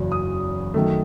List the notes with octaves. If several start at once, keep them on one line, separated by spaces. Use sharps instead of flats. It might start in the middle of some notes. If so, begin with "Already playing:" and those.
Already playing: F#1 E2 C#3 F#3 C#4
D#6
F#2 D#3 A3